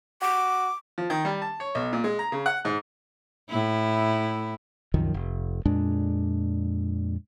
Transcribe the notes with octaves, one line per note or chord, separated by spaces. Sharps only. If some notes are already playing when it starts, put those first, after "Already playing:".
F#4 D6
F3
D#3
G3
A5
C#5
B1
A#2
G#3
A#5
C#3
F#5
G#2
A2 E4
C2 F#2 D#3 F3
F1
F2 A#2 G#3 D4